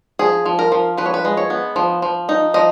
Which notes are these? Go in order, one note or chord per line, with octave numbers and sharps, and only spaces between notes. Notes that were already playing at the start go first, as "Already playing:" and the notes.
F3 G#4
F3
A#4
F3
F3 B4
C#5
B4
G#3
C#5
B3
F3
F3
D#4
F3 D#5